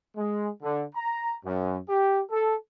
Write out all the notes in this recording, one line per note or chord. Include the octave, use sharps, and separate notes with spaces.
G#3
D3
A#5
F#2
G4
A4